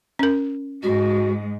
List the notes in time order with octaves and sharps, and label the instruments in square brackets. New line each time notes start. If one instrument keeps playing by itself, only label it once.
[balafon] C#4 A#4
[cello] G#2 G#3 [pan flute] F#4